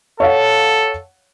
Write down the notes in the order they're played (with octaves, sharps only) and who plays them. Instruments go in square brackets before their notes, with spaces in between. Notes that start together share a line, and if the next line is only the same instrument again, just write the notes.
[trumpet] A4 [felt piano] C#5 F5 F#5